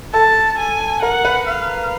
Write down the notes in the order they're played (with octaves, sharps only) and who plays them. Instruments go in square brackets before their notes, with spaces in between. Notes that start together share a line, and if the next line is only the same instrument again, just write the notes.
[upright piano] A4 [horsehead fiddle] A5
[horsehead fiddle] G#5
[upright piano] A#4 [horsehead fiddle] F#5
[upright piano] B4
[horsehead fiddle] F5